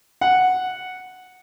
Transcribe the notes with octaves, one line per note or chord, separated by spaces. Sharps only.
F#5